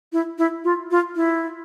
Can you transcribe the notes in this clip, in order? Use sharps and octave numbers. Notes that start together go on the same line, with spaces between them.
E4
E4
F4
F4
E4